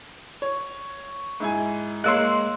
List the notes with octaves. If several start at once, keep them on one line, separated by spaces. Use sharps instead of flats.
C#5
G#2 E4 G#5
G#3 A#3 C#5 C6 E6 F#6